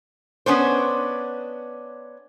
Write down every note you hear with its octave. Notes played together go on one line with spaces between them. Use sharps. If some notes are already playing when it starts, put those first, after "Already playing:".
B3 C#4 D4 C5